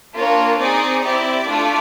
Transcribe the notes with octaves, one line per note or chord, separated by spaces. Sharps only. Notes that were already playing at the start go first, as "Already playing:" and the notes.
A#3 D4 F4 C#5
C4 D#4 G#4 D5
C4 E4 G4 D5
A3 D4 F4